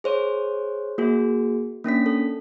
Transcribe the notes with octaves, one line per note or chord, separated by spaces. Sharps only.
G#4 C5 C#5
A#3 F#4 G#4
A#3 C#4 D4 B6
A4